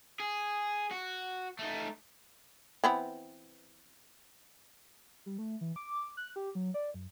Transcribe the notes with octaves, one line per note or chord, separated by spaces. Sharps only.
G#4
F#4
A3 D#4
E3 B3 C4
G3
A3
E3
D6
F#6
G4
F#3
D5
F#2